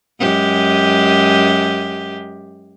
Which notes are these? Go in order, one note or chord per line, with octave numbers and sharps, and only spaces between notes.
F#2 G#3 G4